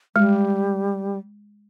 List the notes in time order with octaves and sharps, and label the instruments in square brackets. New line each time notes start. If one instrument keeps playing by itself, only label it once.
[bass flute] G3 [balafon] G#3